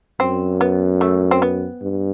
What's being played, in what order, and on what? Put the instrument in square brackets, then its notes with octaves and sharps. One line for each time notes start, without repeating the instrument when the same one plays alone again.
[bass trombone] F#2 [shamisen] C4
[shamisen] B3
A3
C4
B3
[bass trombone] G2